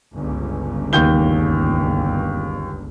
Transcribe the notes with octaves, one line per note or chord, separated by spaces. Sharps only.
G1 C#2
D#2 G6 G7